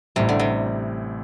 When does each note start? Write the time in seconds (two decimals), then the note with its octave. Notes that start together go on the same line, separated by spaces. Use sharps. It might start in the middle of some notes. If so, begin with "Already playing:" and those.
0.16 A1 A2 C3 G3
0.29 D3
0.40 C3